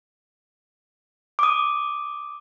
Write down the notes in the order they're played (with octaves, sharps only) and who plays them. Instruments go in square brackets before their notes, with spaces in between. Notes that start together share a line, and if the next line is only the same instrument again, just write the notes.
[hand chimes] D6 D#6